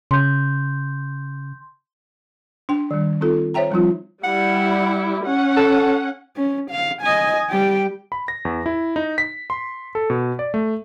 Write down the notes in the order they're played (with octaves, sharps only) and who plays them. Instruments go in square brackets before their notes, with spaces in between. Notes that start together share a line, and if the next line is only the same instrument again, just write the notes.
[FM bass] C#3 [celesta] C6 G6
[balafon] D4 G5
D#3 G3
C4 D#4 F4 A4
C5 C#5 E5 G5 A#5
F3 G3 C4 D#4 F4
[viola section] G3 E4 [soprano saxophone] F#5
[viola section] C#4 F#5
[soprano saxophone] A4
[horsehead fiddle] C#4
F5
D#5 G#5
G3 G5
[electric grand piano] B5
A#6
E2
E4
D#4
B6
C6
A4
B2
D5
A3